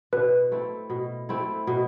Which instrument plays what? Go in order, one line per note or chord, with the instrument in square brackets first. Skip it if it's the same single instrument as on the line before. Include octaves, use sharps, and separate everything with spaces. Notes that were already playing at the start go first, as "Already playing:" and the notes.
[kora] B2 [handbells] B4
[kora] A3 C4 E4
B2
A3 C4 E4
B2